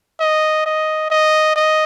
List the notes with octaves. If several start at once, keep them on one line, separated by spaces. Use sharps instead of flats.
D#5
D#5
D#5
D#5